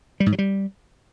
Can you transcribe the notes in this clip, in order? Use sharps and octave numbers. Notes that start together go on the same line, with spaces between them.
G3
G#2
F#3
G3